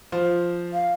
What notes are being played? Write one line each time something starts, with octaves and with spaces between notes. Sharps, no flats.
F3 F4 C5
F5